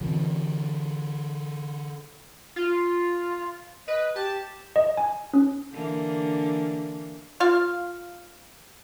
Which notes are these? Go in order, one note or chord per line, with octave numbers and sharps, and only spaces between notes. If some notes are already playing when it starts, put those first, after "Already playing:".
D3 E3 C4
F4
B4 D#5
G4 A5
D#5
G#5
C#4
D3 E3 A#3
F4 F5